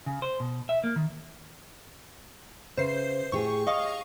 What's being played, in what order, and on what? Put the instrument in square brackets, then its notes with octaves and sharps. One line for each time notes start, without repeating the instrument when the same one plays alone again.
[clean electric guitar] C#3
C5
B2
E5
A#3
D#3
[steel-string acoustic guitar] C#3 [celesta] B4 E5 [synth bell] C5 C7
[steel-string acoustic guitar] A2 G4 G#4 [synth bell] C#6
[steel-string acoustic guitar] C#5 [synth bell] D#5 F5 C#6 [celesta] D#6